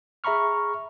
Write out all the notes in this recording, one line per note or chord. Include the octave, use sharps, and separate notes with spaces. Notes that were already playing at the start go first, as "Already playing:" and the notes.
G#4 E5 A#5 B5 C#6 F6